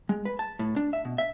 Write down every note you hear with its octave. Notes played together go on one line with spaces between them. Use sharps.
G#3
B4
A5
A2
D4
E5
B2
E5